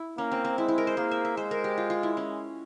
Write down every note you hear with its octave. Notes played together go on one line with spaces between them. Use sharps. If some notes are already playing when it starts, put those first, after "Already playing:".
Already playing: E4
A#3 C#4
C4
C4
G#3 E4
E4
A#4
C5
A#3 G#4
E5
E5
G#3 C5
A#4
G4
F4
F4
E4
C#4